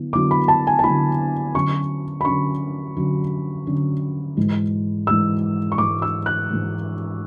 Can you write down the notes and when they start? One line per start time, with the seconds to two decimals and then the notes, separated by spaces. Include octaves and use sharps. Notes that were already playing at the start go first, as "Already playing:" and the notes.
Already playing: D3 F#3 B3 E4
0.13 D3 F#3 B3 E4 D6
0.31 B5
0.48 A5
0.67 G#5
0.79 A5
0.84 D3 F#3 B3 E4 B5
1.54 D3 F#3 C#4 C#6
2.21 B5
2.25 D3 F#3 C#4 C#6
2.97 D3 F#3 C#4
3.67 D3 F#3 C#4
4.37 G#2 E3 G#3
5.07 G#2 E3 G#3 E6
5.72 C#6
5.78 G#2 E3 G#3 D6
6.02 E6
6.26 F#6
6.49 G#2 E3 G#3